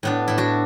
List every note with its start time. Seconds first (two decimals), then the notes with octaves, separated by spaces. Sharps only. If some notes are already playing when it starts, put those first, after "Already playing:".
0.03 A2 B3 D4
0.28 A2 E4
0.38 D4 F#4